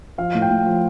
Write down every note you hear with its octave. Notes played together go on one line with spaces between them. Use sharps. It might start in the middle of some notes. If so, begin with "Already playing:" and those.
F3 F5
A2
G5
A2
F3